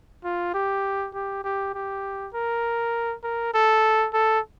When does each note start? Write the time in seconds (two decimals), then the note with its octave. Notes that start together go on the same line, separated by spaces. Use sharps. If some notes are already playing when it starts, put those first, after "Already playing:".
0.24 F4
0.54 G4
1.14 G4
1.44 G4
1.74 G4
2.34 A#4
3.24 A#4
3.54 A4
4.13 A4